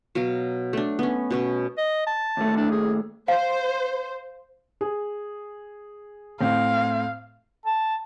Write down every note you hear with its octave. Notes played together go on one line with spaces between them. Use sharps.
B2 F#3 F5 A#5
A3 D4
B3 C#4
B2 B3 C#4
D#5
A5
D#2 A2 A3
D4
G#4
C5 F5
G#4
A2 C4 F5
A5